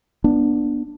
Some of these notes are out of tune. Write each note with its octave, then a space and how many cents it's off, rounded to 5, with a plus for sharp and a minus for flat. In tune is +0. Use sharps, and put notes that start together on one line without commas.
B3 -30 D4 +5